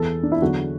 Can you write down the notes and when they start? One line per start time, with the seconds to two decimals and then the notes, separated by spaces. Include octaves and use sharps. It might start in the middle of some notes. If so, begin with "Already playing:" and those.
Already playing: E2 E3 A4
0.23 D4
0.32 E4
0.42 E2 D3 F#3 F#4